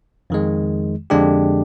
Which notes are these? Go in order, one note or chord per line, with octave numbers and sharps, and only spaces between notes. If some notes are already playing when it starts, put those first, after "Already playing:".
F2 D#3 G#3
F2 D3 G#3 D4 G4